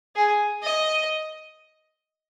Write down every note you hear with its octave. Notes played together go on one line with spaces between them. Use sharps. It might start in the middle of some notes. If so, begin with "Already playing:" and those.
G#4
D#5